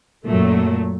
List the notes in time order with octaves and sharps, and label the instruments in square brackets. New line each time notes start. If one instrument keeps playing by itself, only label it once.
[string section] F#2 A#2 F#3 A3